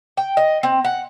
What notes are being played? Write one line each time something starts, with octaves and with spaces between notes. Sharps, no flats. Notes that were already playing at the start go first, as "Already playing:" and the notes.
G5
D#5
C4
F#5